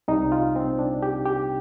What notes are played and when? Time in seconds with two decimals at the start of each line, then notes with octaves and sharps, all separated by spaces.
0.08 C2 C3 G3 D#4
0.32 F4
0.56 C4
0.79 D4
1.03 G4
1.25 G4